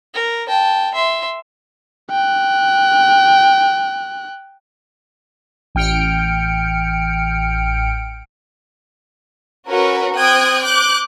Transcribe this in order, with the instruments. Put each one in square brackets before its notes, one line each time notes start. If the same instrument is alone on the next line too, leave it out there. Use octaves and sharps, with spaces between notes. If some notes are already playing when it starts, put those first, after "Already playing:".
[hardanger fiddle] A#4
G5 A5
E5 C6
[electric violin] G5 F#6
[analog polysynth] A1 G5 F6 C#7 D7
[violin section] C#4 F#4 A#4 B4
C4 G5 D#6 F#6 G#6
D6 F#6 G6